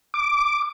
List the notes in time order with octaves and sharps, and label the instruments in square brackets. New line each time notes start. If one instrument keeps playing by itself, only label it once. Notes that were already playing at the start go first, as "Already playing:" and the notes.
[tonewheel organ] D6